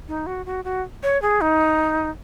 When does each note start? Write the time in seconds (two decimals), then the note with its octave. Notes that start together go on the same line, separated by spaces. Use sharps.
0.08 D#4
0.26 F#4
0.46 F#4
0.65 F#4
1.03 C#5
1.22 G#4
1.41 D#4